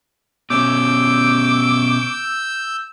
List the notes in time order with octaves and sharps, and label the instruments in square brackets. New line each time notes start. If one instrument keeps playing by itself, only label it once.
[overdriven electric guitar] B2 C#4 [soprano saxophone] D6 [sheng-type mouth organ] E6 G6